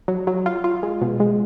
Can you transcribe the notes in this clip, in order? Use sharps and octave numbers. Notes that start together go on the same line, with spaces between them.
F#3
F#3
F4
F4
G#3
B2
G#3